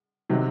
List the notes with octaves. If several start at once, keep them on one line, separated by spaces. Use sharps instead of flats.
C3 D#3 F#3